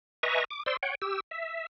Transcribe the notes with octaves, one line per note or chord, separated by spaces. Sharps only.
B4 D#5 E5 G#5 A#5 C#6
D6
C5 D5 C6 E6
C#5 F#5 G5
G4 E6
E5